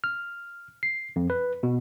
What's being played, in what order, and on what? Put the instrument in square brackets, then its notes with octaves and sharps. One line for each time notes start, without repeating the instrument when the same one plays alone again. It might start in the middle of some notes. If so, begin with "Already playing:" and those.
[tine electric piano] F6
C7
F2
B4
B2